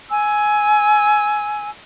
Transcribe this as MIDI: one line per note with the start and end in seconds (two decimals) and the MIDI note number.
0.09 1.70 80
0.09 1.70 88